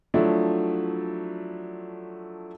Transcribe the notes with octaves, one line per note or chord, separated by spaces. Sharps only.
F3 F#3 A3 D4 E4